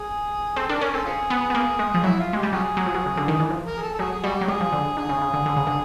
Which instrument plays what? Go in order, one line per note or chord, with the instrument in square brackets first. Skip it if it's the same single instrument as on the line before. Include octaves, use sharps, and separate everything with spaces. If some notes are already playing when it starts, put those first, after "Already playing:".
Already playing: [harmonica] G#4
[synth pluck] C4 [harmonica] A4
[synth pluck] D4 [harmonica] A#4
[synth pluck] C#4 [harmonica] A#4
[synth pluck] C4 [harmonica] A4
[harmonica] C#4 F4 G#4
[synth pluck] B3
B3
A#3
G#3
F3
[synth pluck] F#3 [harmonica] E4
[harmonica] F4
[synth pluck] G#3 [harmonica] G4
[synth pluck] G3
[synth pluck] F#3 [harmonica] C#4 F4 G#4
[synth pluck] F#3
F3
F#3
C#3
D3
D#3
E3
F3
[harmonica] A#4
G#4
A4
A4
[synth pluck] F#3 [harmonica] G#4
[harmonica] G#4
[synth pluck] G3 [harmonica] F#4
[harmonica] G4
[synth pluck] F#3
[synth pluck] G3 [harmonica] G#4
[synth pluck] F3
D3
[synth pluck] D3 [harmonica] G#4
[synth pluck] C#3
C#3
D3
D3
C#3
D3